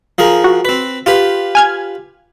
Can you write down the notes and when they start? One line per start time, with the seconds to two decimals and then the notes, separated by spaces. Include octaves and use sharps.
0.18 F3 G#4 A#4
0.44 F#4
0.65 C4 B4
1.06 F4 G4 B4
1.55 G#5 F6 G#6